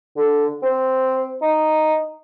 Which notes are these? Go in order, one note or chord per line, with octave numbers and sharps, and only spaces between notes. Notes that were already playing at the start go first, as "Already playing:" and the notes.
D3
C4
D#4